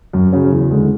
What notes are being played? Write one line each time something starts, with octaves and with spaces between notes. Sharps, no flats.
F#2
C#3 F#3 C#4
E2
D3 G#3